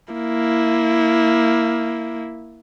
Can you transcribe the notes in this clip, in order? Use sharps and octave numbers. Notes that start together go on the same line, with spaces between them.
A#3 E4